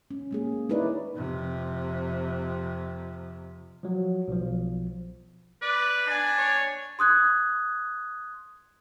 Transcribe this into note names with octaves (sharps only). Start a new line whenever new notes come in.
C#4
G#3 A#3 G#4
D#4 E4 A#4 B4 C#5 D5
F2 C3
F3 F#3
B1 F3
B4 D5
D4 G#5
C#5
C6 D#6 F#6 G#6